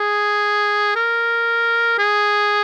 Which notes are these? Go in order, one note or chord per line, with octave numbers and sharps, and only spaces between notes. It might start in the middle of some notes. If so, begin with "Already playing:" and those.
Already playing: G#4
A#4
G#4